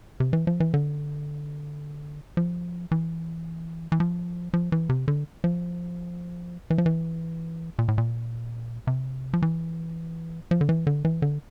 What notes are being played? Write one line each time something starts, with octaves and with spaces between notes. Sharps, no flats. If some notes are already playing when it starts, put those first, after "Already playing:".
C3
E3
F3
E3
D3
F3
E3
E3
F3
F3
E3
C3
D3
F3
E3
F3
E3
A#2
A2
A#2
C3
F3
E3
F3
D3
E3
D3
E3
D3